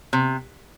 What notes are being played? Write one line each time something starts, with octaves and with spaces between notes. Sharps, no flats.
C3